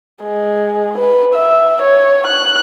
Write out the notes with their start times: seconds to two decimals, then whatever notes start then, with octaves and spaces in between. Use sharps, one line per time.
0.24 G#3
0.99 B4
1.35 E5
1.83 C#5
2.27 F#6